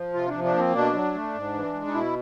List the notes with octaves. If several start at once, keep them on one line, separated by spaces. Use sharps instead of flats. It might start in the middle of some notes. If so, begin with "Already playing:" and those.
Already playing: F3
C3 F4
F3 D4
D4
A#3
C4
B2 D4
F#3
A3
G#2
E3
G#3
D#4
B2 E4